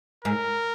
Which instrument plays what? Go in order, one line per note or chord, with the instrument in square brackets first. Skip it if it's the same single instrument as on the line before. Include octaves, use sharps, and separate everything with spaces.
[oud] G#2 [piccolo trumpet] A#4